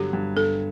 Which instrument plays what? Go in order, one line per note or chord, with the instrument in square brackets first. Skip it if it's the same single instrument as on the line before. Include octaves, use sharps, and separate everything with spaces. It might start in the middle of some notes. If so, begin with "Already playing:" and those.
Already playing: [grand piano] G2 D3 F#3 [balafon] G4
[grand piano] G2
[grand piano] G2 [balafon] A4